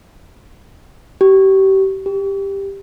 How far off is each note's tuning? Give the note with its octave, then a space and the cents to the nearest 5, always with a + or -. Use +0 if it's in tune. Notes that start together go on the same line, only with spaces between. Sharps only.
G4 -30
G4 +10